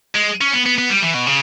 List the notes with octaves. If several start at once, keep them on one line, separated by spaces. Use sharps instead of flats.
G#3
C#4
B3
B3
B3
G3
E3
B2
C#3